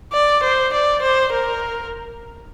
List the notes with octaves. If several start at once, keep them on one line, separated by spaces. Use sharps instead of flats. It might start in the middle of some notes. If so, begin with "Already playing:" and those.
D5
C5
D5
C5
A#4